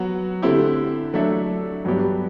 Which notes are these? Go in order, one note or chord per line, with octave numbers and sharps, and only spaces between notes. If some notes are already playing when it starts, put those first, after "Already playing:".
Already playing: F#3 B3 F#4
D3 A3 C4 E4 G4
F#3 A3 D4 A4 E5
G2 F#3 B3 D4 G4